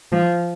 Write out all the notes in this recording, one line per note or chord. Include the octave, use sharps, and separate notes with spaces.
F3